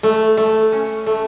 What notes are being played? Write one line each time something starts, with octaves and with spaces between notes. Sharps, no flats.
A3
A3
C#4
A3